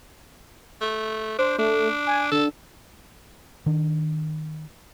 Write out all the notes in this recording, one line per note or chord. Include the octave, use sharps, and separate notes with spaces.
A3
D4 C5
A3 D4
G#5
D3 A4
D#3 D4